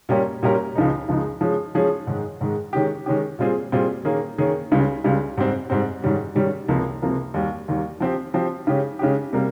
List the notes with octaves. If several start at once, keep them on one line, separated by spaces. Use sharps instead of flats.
A#2 G3 C#4 G4 A#4
A#2 G3 C#4 G4 A#4
C#2 C#3 F3 G#3 D#4
C#2 C#3 F3 G#3 D#4
F3 G#3 C#4 G#4
F3 G#3 C#4 G#4
G#2 D#3 G#3
G#2 D#3 G#3
D#3 G#3 C#4 G4
D#3 G#3 C#4 G4
A#2 G3 C4 F4 G#4
A#2 G3 C4 F4 G#4
D#3 A#3 C#4 G#4
D#3 A#3 C#4 G#4
C#2 C#3 G3
C#2 C#3 G3
G#2 G3 C4
G#2 G3 C4
G#2 D#3 G3 C#4
G#2 D#3 G3 C#4
C#2 C3 F3 A#3
C#2 C3 F3 A#3
D#2 D#3 G3
D#2 D#3 G3
F3 C4 G4
F3 C4 G4
C#3 G#3 C#4 G4
C#3 G#3 C#4 G4
C3 G3 A#3